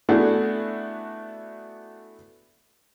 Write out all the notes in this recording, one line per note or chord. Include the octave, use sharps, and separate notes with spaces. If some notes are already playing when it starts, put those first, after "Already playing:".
A3 B3 D4 E4 F#4 G#4